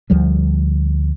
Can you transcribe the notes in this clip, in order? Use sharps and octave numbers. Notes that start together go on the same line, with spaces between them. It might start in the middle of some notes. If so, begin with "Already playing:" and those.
D2 F3 G3